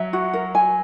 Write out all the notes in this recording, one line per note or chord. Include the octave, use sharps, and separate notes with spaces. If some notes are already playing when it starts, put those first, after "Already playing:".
Already playing: F#3 E5
F#4
A#4
G#5